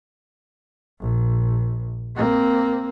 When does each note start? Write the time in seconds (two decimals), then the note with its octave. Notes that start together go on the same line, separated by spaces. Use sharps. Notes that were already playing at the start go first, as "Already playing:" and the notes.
1.00 A#1
2.17 A#3 C4